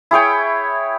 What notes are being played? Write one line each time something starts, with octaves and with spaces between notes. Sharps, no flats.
E4 G#4 C#5 G5